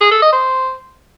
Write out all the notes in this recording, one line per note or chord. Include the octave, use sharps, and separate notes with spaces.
G#4
A4
D#5
C5